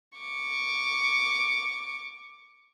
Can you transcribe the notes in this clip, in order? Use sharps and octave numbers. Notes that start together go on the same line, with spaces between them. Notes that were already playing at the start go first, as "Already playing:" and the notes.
C#6 D6